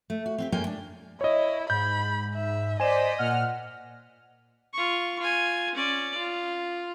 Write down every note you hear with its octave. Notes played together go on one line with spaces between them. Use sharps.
A3
F#4
C4 F#4 G4
F#2 G#3 A#3 A#4 G5 G#5
D4
E4 C#5 D#5
G#2 B5 G6
E5
C5 D5 D#5 G#5 B6 E7
A#2 F#5 F6
F4 C#6
F4 G#5
C#4 D5
F4